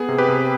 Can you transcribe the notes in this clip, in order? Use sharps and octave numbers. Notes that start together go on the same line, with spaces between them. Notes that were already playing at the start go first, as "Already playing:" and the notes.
Already playing: B3 G#4
C3
G4 B4
C3